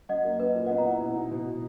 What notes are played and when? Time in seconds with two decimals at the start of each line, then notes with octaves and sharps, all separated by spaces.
0.09 F#2 D#5 F#5
0.24 A#3
0.39 C#4 B4 D#5
0.55 A#2
0.66 D#5 F#5
0.71 B3
0.77 F#5 A#5
0.85 E4
1.01 B2
1.16 D#4
1.31 B2